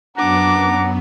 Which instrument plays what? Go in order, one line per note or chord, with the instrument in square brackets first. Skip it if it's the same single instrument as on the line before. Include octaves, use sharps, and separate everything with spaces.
[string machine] F#2 F#3 B3 [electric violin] D4 D6 [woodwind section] F#5 A#5